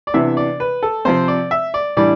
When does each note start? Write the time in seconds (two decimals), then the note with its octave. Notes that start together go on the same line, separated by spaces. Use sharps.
0.07 D5
0.14 C3 E3 B3 D4 E5
0.37 D5
0.60 B4
0.83 A4
1.05 C3 F3 C4 C5
1.28 D5
1.51 E5
1.74 D5
1.97 A2 E3 G3 D4 D5